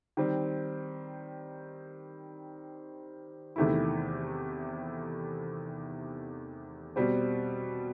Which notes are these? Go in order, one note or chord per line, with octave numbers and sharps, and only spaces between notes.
D#3 G3 C4
E2 C3 D#3 A3 E4
B2 G3 C4